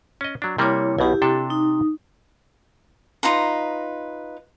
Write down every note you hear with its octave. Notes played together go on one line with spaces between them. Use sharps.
C#4 D#5
F#3 D4
C3 G3 A#3 E4 C#5
B1 B2 E4 G4
C3 D4 A4
D#4
D#4 F4 B4 A#5